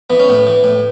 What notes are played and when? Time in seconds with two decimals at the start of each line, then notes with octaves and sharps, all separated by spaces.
0.10 E3 B3
0.20 C#4
0.28 A2 B3
0.47 E3
0.64 A2